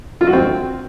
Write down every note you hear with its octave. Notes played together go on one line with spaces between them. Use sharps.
F4
F#4
C4